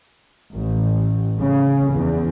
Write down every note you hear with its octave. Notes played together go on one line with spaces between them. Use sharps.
A1
C#3
E2